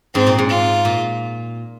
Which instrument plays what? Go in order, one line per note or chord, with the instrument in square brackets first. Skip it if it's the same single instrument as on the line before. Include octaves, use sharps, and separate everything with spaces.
[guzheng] G#2 [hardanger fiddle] C4
[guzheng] A#2
G#2
[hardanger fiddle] F4
[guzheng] A#2